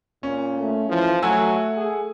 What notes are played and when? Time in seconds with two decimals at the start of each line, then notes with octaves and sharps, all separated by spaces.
0.23 A#2 C#4
0.59 A3
0.89 E3 F3
1.23 F#3 A3 F#5 G#5 E6
1.77 G#4